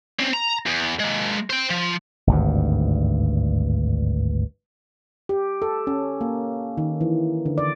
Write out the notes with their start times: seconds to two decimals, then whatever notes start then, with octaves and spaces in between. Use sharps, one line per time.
0.20 C4 C#4
0.34 A#5
0.66 E2
1.00 G#3 A#3
1.50 C5 G5
1.70 F3
2.27 G#1 D2 G2
5.29 G4
5.62 A4
5.87 C#4
6.21 A#3
6.78 D#3
7.01 E3
7.46 D3
7.58 D5